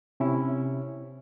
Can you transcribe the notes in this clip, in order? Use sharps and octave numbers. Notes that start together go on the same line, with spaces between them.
C3 C#4 E4